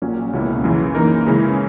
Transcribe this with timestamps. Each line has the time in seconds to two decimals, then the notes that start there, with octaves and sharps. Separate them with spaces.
0.02 A#1 A#2 F#3 C#4
0.33 C#2 B2 A#3 C#4 E4
0.64 F#2 C#3 E3
0.95 F#2 E3 A#3 D#4 A#4
1.26 C#3 E3 G#3 C#4 E4